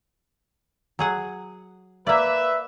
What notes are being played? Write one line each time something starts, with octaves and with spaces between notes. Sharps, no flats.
F#3 G#4 F#5
A#3 B4 D5 E5